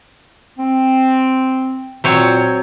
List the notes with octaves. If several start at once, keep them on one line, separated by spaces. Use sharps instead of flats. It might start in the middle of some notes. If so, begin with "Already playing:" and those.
C4
A#2 F#3 C4 C#5